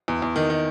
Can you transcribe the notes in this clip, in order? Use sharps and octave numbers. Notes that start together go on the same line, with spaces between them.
E2
E2
D#3
D#3